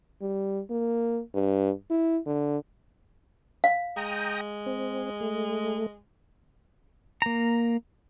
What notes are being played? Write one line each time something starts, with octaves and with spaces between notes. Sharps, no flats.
G3
A#3
G2
E4
D3
F5
G#3 G5 A#5 D#6
C4
A3
A#3 A#5